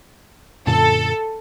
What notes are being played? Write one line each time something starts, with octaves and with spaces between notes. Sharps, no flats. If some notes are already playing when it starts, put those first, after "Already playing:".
F#2 A#2 D3 A4